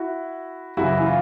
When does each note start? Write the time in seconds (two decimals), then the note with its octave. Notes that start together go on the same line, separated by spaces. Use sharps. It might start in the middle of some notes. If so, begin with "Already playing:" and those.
Already playing: E4 F#4
0.77 F#2 C#3 E3 E4 F#4
1.00 E4
1.06 F4